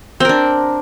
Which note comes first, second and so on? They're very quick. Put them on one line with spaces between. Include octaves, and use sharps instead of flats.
C4 A#4 D4